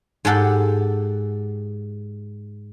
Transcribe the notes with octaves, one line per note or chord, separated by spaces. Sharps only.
G#2 G4 A4 F#5